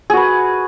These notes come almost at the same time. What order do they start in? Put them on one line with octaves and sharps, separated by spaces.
G#4 F#4 B4